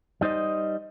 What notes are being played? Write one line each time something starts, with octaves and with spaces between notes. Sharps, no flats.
G3 D#4 C5 D#5